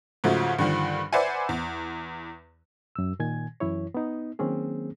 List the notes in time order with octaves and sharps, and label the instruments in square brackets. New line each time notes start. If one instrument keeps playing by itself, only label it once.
[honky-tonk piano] G#2 C#3 F3 F#3 A3
G2 D3 D#3 F3
B4 C5 D5 E5 F#5 G#5
E2
[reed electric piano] F#2 E6
A#2 D#3 G#5 G#6
F#2 E3 E4 C#5
B3 D#4
D#3 F#3 A#3 C4 C#4 G#4